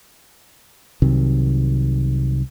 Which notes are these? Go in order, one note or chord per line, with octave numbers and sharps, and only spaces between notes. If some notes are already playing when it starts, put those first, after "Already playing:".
C2 C3 D#3 F#3